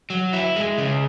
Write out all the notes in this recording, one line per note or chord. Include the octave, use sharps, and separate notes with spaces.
F#3
E4
G#3
C#3